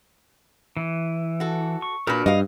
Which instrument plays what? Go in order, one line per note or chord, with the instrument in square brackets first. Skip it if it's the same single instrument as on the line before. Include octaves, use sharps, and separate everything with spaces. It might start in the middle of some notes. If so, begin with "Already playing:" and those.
[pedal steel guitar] E3
[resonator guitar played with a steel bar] F#4 A4
[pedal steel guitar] C#6
[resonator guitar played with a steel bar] A#2 B4 [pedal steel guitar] D4 F#4 A#4
[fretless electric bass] G2 [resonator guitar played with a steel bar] D#5 F5